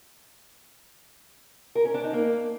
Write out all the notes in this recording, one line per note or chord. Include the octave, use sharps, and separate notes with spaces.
A#4
C#4
D4
D#4
A#3